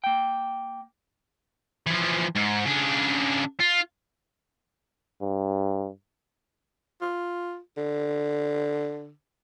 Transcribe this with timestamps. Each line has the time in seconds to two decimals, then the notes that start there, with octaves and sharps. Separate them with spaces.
0.04 A#3 G5
1.87 E3 F3
2.35 G#2
2.65 C#3 D4
3.60 F4
5.21 G2
7.01 F4
7.77 D3